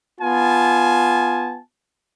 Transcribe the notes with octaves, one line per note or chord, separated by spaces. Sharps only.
B3 F4 G#5 A5